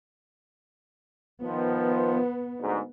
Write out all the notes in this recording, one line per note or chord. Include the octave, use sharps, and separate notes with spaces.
D#3 F3 B3
D2 G#2